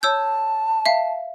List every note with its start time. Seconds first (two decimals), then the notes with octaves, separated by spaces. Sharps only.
0.03 C#5 A5 E6 G6
0.86 E5 F5